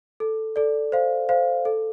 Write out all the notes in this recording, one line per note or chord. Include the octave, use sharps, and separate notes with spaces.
A4
A4 D5
C5 F5
C5 F5
A4